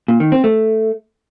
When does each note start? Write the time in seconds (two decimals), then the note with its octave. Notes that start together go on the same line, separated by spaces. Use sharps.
0.08 A#2
0.20 D#3
0.32 C4
0.44 A3